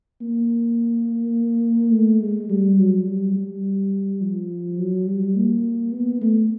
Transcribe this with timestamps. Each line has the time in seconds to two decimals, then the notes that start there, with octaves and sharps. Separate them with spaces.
0.21 A#3
1.93 A3
2.21 G#3
2.50 G3
2.79 F#3
3.07 G3
3.36 G3
4.21 F3
4.78 F#3
5.07 G3
5.36 A#3
5.93 B3
6.22 A3